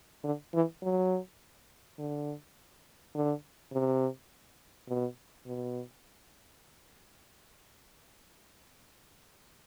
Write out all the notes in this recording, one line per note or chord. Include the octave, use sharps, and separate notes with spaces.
D3
E3
F#3
D3
D3
C3
B2
B2